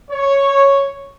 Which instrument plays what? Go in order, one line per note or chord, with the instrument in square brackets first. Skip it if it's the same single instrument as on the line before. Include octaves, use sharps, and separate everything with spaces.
[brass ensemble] C#5